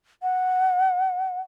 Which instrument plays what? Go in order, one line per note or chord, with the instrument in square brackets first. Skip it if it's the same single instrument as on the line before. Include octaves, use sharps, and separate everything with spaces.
[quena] F#5